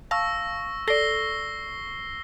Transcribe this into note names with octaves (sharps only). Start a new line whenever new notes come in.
F5 A5 C#6 E6 A#6
A4 D5 A#6 C7 G7